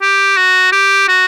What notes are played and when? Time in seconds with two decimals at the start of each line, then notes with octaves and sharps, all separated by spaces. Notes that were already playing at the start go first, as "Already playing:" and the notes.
0.02 G4
0.37 F#4
0.72 G4
1.08 F#4